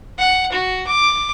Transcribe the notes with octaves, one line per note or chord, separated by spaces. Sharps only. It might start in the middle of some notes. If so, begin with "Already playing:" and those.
F#5
F#4
D6